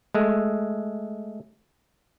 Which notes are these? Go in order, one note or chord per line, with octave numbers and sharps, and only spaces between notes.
G#3 A3